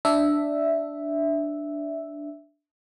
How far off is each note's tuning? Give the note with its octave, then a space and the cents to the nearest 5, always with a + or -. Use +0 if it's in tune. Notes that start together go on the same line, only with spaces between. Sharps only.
D4 +0 E5 +0